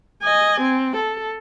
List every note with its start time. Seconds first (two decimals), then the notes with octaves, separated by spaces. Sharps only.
0.22 D#5 G#5
0.61 C4
0.96 A4